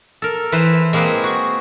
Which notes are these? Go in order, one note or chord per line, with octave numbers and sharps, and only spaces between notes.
A4 A#4
E3 B4 C5
G#3 A#3 C4 G#4 B4 C5
F#4